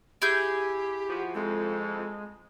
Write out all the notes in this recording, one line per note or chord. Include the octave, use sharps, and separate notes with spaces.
E4 G4 G#4 G6
F3 F#4
F2 G#3 A4